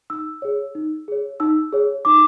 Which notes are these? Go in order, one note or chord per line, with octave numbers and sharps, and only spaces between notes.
D#4 E6
G#4 C#5
D#4
G#4 C#5
D#4 E6
G#4 C#5
D#4 D6